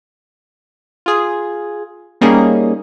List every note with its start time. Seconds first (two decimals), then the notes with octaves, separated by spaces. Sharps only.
1.06 F4 G#4
2.21 G3 A#3 C#4 D#4 G#4